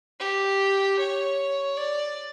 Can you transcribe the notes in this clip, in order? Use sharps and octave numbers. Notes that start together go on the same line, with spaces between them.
G4
C#5
D5